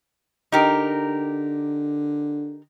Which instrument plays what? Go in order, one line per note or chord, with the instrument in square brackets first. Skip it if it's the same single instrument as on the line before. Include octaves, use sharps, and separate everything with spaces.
[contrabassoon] D3 [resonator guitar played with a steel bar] D#4 G4 A#4